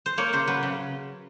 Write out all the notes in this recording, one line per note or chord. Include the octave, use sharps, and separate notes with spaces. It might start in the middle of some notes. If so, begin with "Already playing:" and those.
C5
A#3 C#5
C#3 C5
F#3 B4
C#3